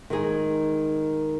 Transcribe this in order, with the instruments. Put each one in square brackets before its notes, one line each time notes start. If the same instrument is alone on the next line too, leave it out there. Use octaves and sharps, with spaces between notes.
[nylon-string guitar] D#3 G#3 D#4 G#4